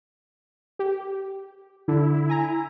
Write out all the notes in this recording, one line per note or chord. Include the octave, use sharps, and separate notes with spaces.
G4
D3 E4
G#5 A#5